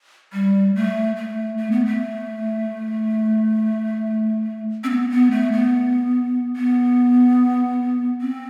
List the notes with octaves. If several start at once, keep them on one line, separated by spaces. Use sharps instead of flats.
G3
A3
A3
A3
B3
A3
C4
B3
B3
A3
B3
B3
C4